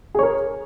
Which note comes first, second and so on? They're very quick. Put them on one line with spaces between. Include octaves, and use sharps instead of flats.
G#4 C#5 A#4